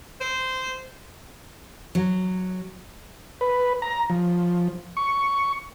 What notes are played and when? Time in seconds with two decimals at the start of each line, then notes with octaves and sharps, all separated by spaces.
0.21 C5
1.95 F#3
3.41 B4
3.82 A#5
4.10 F3
4.97 C#6